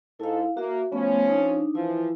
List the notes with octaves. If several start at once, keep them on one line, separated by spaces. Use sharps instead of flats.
G#2 E4 A4 F5
A#3 F#4 E5
F3 A3 B3 C#4
D4 D#4
E3 F3 E4